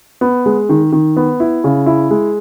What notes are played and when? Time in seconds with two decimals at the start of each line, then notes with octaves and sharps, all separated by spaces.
0.21 B3
0.46 G#3
0.69 D#3
0.92 D#3
1.17 B3
1.40 E4
1.64 C#3
1.86 E4
2.11 G#3